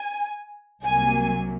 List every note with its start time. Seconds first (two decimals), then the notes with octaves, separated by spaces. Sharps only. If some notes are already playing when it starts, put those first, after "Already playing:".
Already playing: G#5
0.84 C2 C3 F#3 A#3 G#5